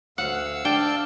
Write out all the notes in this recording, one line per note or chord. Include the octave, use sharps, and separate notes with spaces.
D2 F5 F#5 E6
D4 D5 G5 A5